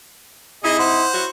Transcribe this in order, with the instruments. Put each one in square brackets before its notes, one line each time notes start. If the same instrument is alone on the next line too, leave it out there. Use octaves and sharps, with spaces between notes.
[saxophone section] C3 D#4 E4 [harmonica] G#4 D#5
[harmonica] C5 F#5
[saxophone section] E4 F#4